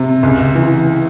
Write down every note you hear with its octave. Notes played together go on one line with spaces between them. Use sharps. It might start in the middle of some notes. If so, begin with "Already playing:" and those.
Already playing: C3
C#2
E3